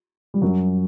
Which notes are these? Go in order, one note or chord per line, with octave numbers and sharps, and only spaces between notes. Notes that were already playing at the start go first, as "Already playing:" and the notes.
G3
F#2 F#3